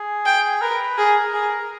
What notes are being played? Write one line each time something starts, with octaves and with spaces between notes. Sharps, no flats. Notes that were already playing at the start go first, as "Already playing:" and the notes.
Already playing: G#4
G5
A#4 B4
G#4 A#4
G#4